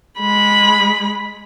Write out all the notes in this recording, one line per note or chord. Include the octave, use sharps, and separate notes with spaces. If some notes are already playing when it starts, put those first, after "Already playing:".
G#3 B5